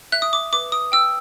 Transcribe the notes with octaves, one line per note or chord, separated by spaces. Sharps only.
E5 F#6
D#6
D6
B4 D6
D#6
G5 E6